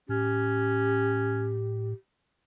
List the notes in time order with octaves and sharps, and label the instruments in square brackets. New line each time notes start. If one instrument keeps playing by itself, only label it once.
[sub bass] A2 [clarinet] C#4 [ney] G4